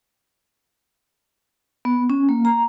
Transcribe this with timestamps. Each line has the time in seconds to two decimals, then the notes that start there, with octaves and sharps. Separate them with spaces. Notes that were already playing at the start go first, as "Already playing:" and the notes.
1.85 B3
2.10 C#4
2.29 A#3
2.45 A#5